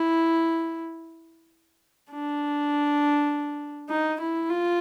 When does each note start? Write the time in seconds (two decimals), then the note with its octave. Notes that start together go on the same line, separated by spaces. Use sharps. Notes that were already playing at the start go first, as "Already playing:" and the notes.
Already playing: E4
2.11 D4
3.89 D#4
4.20 E4
4.49 F4